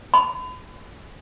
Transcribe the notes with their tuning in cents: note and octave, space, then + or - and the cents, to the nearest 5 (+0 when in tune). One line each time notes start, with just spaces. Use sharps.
B5 +35